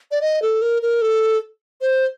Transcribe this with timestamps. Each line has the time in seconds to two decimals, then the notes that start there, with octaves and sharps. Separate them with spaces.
0.11 D5
0.22 D#5
0.42 A4
0.62 A#4
0.82 A#4
1.02 A4
1.81 C5